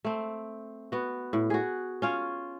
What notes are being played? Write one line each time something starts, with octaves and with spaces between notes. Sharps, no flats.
A3 C4
B3 F#4
A2
F#4 G#4
C#4 F4 C#5